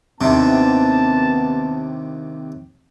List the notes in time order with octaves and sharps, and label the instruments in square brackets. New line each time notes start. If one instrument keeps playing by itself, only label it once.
[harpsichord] D#2 C3 [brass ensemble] B3 A5 [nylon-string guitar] C4 D4 E5